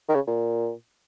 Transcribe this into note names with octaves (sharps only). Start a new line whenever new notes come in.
D#3
C#3
A#2